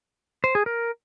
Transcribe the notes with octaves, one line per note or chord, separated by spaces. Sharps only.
C5
G#4
A#4